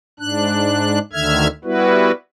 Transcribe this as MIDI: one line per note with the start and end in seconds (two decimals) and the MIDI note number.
0.19 0.99 44
0.19 0.99 62
0.19 0.99 90
1.13 1.48 38
1.13 1.48 50
1.13 1.48 51
1.13 1.48 76
1.13 1.48 89
1.13 1.48 92
1.64 2.11 55
1.64 2.11 59
1.64 2.11 64
1.64 2.11 66
1.64 2.11 71